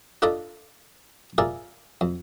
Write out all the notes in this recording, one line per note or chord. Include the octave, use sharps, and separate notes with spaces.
D4 F4 A4 D5 D#5 B5
F4 G#4 A#4 D5 E5
F2